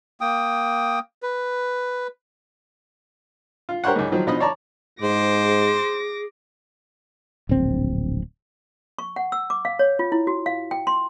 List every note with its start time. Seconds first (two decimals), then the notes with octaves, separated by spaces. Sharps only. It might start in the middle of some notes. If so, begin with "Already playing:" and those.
0.21 A#3 G5 D#6
1.23 B4
3.69 F4
3.84 G4 A#4 C5 C#5 F#5
3.96 C#2 G#2
4.12 D#3 F3 F#3
4.27 B2 F3 D#4 D#5 B5 D#6
4.40 C#5 D5 A5 A#5
5.02 G#2 G#4 C5 D6 A#6
7.49 D1 A#1 C4
8.99 C#6
9.16 F#5
9.32 E6
9.50 D6
9.65 F5
9.79 C#5
9.99 F4
10.12 E4
10.27 F#4
10.46 F5
10.71 G5
10.87 C6